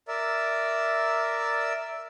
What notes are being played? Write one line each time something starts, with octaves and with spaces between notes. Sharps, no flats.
A#4 D5 E5